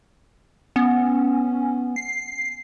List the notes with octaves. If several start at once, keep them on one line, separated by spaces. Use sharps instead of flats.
B3 C#4
C7